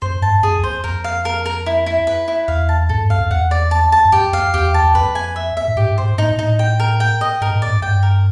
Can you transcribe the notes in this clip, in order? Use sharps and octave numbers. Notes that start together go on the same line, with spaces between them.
F#2 C5
G2 A5
F#2 G#4
E2
F2 C5
F2 A#4
F5
A#4
A#4
E4
E4
B4
E4
E2 F5
A5
G#2 A4
G2
F#2 F5
F2
E2 F#5
D5
A5
A5
F#2
F2 G4
F2 F5
E2 G4
A5
E2
F2 B4
G#5
E5
E5
A2
G#2 G4
G#2
C5
G#2
A2 D#4
A#2
A2 D#4
G5
A#4
G5
D#5
G#2 A#4
A2
D5
G#2
G2 G5
A#4